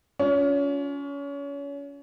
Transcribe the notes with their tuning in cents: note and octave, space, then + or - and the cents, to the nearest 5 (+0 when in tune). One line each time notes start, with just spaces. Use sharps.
C#4 +30 F4 +25